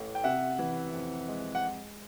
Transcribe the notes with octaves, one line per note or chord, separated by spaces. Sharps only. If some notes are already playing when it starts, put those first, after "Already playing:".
Already playing: A1 A2 E3 A3
G5
C3 E5 F#5
E3
F2
G#3
F#5